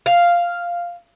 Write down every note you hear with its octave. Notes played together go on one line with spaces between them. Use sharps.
F5